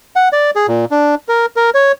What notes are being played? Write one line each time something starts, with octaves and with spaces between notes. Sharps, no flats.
F#5
D5
G#4
A#2
D4
A#4
A#4
C#5